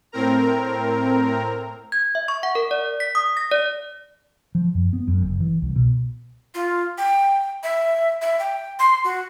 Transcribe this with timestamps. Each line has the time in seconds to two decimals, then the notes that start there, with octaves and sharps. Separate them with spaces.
0.12 A2 C4 A#4 A#5
1.92 G#6
2.15 E5
2.28 C#6
2.43 F#5
2.55 A#4
2.71 D5
3.00 B6
3.15 D#6
3.37 A#6
3.51 D5
4.55 F3
4.75 F#2
4.93 B3
5.08 F#2
5.22 F#1
5.40 E3
5.62 C2
5.76 B2
6.54 F4
6.98 G5
7.63 E5
8.22 E5
8.39 G5
8.79 C6
9.04 F#4